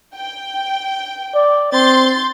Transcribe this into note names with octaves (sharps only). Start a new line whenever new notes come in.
G5
D5
C4 C6 G6 A6